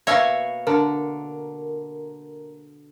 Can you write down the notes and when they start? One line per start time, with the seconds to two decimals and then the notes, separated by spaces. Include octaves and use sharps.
0.07 B2 A#3 C#5 E5 F5
0.67 D3 A#4